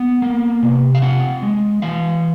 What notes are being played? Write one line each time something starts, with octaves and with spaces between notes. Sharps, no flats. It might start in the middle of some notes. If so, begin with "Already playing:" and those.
Already playing: B3
A#3
C3
F5
C4 F#5
G#3
E3 F5